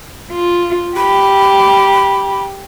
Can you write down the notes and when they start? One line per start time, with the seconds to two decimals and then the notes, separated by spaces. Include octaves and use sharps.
0.32 F4
0.97 G4 B5